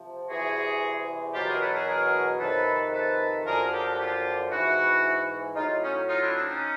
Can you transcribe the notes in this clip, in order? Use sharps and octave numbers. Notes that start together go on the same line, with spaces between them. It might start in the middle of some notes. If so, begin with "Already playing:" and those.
Already playing: C3 F3
E2 C3 E3 F#4 G#4
E2 B2 F#3 F4 G4
G#4 A#4
A4 B4
G#4 A#4
G#4 A#4
F2 C3 D#3 A4 B4
A4 B4
F#2 D3 F3 G#4 A#4
G4 A4
F#4
F4 G4
G#2 E3 E4 F#4
A2 F#3 D#4 F4
C#4 D#4
D#4 F4
D4 E4
C4 D4
C#4 D#4